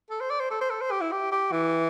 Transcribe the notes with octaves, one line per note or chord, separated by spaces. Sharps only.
A4
C5
D5
C5
A4
C5
A4
C5
G4
E4
G4
G4
E3